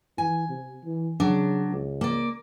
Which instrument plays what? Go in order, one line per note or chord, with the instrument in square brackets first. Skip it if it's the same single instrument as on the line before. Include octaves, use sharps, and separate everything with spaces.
[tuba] E3 [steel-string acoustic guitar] G#5
[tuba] C3
E3
[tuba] C#3 [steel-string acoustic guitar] F#3 D4
[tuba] C#2
[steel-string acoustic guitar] A#3 D5